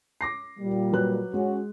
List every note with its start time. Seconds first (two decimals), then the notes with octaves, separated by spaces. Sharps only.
0.21 D6 A#6 C7
0.59 A#2 G3
0.92 F#3 B4 F#6
1.33 G#3 C#4 F#4